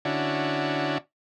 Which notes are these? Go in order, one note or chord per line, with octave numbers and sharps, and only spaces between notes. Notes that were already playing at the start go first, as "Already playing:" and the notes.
D3 C#4 D4 E4 F#4